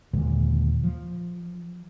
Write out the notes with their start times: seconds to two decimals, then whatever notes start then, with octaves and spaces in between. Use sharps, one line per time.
0.13 D#2 A#2 D3 G#3
0.83 F3